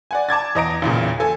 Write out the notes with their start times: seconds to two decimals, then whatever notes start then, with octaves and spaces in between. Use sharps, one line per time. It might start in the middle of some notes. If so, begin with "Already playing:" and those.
0.11 D5 F#5 G#5
0.29 A5 D6 G#6 A6
0.55 E2 D#5 A#5 D7
0.82 A1 E2 A#2 C#3
1.20 A4 G#5